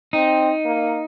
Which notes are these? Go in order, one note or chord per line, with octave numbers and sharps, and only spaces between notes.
C4 D#4
A#3